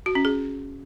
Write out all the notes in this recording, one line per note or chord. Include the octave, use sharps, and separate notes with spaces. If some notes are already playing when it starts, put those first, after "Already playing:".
F#4
C#4
G#4